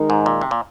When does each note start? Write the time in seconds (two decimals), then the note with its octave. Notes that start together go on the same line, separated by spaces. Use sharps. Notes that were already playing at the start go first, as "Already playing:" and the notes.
Already playing: D#3 G#3 D#4 A#4
0.10 G#2
0.26 A#2
0.41 C3
0.51 A#2